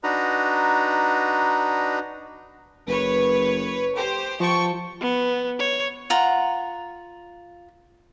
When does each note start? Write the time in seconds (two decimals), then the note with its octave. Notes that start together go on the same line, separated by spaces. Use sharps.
0.03 D4 D#4 F#4 B4 A#5
2.87 F#1 B4 C#5
3.94 G4 C5
4.40 F3 G5 A5 C#6
5.01 B3
5.60 C#5
6.10 F4 F#5 A#5